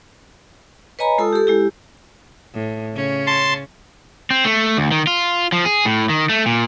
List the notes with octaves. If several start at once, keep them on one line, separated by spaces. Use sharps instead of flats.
B4 C#5 D#5 G#5 A#5 B5
G#3 F4 A4 A5 D#6 E6
G4 A4
G#3 E4 G4
A2
C#3 C#4
A5 C6
C4
A3
D2
D#3
F4
F3
G#4
A2
D#3
A3
A#2